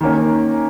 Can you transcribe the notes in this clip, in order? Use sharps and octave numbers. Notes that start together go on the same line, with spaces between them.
D#3 A#3 C#4